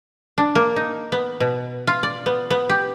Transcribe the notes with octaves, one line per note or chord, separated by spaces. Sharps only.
D4
A#3
D#4
B3
B2
F4
D5
B3
B3
G4